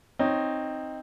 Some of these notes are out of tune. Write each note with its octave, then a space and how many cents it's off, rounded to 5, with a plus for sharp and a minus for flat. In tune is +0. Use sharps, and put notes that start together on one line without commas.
C4 +5 D#4 +0 C#5 -5